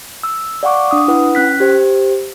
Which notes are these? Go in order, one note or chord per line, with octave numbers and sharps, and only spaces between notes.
E6
D5 F5 F#5 C#6 D6
D4 D#6
E4 B4 F#5
C#4 F#6 B6
G4 C5